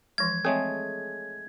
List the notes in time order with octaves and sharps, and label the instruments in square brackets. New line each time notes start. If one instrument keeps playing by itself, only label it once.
[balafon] E3 F3 G#3 [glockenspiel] G#6
[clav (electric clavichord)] G#3 A3 G#4 [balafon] C4 [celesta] A4 C#5